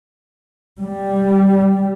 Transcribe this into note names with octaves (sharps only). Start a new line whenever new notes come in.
G3